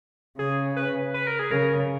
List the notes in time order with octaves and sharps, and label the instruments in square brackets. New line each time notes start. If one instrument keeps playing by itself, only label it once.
[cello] C#3 [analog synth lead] G#4
[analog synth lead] B4
B4
A#4
G#4
[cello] C#3 [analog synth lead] A#4